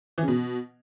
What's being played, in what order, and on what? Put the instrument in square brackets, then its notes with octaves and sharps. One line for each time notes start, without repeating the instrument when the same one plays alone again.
[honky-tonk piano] E3
C#3
B2